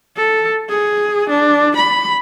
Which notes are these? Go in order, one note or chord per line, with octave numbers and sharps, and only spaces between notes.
A4
G#4
D4
B5